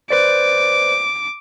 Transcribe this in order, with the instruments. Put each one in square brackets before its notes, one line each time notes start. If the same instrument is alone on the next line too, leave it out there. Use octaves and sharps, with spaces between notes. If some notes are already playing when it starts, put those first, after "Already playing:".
[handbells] B4 C5 D5 [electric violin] D6